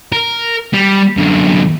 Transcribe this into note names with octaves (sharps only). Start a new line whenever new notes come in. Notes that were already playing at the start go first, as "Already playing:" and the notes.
A#4
G3
F#2 D3